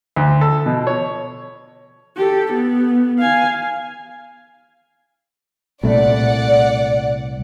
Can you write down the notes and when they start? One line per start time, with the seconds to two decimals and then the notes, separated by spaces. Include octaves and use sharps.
0.16 D2
0.41 A4
0.66 B2
0.87 C#5
2.16 G4 A4
2.52 B3
3.19 F5 G#5
5.84 C2 A#2 A3 D5 F#5